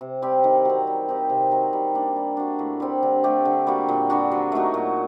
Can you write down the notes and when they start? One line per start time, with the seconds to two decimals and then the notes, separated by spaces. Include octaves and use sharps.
0.01 C3
0.22 G3 C4 G4
0.44 D#3
0.65 F#3 C4
0.87 G3
1.09 C4 D#4 G4
1.30 C3
1.51 F#3 C4 D#4
1.73 G3
1.95 A#3 D4
2.16 G3
2.37 D4 F#4
2.59 A2
2.80 G3 C4
3.03 D3
3.24 A3 D4 G4
3.45 D3
3.67 G3 A#3 F#4
3.89 A#2
4.10 G3 D4 F#4
4.32 F#3
4.52 A3 D#4 F#4
4.74 A#2